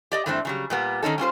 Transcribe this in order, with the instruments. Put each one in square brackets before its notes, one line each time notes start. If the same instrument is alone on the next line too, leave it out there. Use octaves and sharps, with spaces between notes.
[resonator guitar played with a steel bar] G4 D5 D#5
G2 E3 A3 C4 D4
C#3 F#3 G3
A#2 G3 B3
D#3 C#4 D#4 A4
G3 C#4 F4 C5